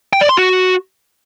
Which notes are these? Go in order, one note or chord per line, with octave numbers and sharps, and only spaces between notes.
G5
D5
C6
F#4